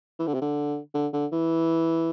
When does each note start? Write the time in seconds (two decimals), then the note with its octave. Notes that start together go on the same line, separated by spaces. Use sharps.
0.19 E3
0.27 D3
0.34 C3
0.41 D3
0.94 D3
1.13 D3
1.32 E3